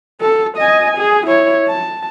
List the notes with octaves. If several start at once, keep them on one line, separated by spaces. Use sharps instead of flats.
A4
D#5 G#5
G#4
E4 C#5
A5